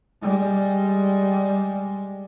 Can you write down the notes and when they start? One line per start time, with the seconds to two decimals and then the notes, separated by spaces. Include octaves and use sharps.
0.22 G3 G#3